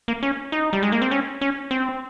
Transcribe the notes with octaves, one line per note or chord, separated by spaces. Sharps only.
A#3
C#4
D#4
G3
G#3
A#3
C4
C#4
C#4
C4